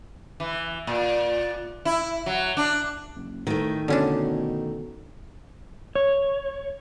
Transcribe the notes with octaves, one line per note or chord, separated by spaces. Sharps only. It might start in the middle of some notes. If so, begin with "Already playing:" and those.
E3
A#2
E4
F#3
D4
F#1
A2 D#3 A3
B2 D3 C#4 D4
C#5